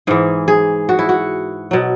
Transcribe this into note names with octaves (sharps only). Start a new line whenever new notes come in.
G#2 E3 G#4
G#4
F#4
E4
F#4
B2 F#3